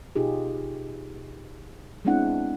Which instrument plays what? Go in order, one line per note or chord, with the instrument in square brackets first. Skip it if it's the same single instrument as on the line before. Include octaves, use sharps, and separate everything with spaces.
[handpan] B2 D#4 F4 G4 G#4
G#3 B3 C4 D4 E4 F#5